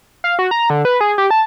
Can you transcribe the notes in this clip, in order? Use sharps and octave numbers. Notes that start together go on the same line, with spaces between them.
F5
F#4
A#5
D3
B4
G#4
G4
A5